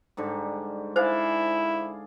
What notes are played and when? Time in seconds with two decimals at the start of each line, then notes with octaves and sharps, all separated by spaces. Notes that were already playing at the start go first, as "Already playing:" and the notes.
0.17 G#2 D3 G3
0.96 E4 G#4 C5 D5 F5